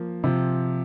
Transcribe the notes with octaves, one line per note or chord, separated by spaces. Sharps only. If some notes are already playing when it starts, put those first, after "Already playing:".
Already playing: F3 A#3
C3 F3